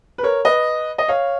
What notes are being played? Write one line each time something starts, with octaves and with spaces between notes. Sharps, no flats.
B4
A#4 C#5
B4 D#5
D#5
C#5 F5